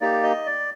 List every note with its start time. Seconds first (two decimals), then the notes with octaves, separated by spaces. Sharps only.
0.01 A#3 D#4 G4 D5
0.23 D#5
0.46 D5